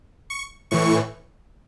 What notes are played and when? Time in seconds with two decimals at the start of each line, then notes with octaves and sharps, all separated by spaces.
0.30 C#6
0.71 A2 E3 C#6